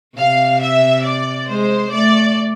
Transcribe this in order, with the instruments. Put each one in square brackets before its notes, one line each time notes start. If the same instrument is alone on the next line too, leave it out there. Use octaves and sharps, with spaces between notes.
[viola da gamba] C3 [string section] F5
[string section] E5
D5
[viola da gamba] G#3 [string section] C5
[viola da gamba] A3 [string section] D5